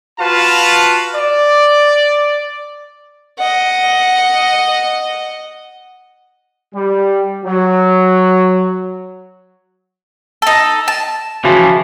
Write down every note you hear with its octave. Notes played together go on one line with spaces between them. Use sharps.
F4 F#4 B4 F5 A5
D5
D#5 F#5
G3
F#3
D#4 A4
A5
C#3 E3 F3 F#4